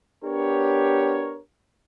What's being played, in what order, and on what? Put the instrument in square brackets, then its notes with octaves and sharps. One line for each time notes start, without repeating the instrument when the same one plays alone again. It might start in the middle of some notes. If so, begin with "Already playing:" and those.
[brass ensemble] B3 D4 G4 A#4 C#5